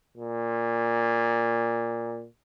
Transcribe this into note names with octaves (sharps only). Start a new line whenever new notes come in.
A#2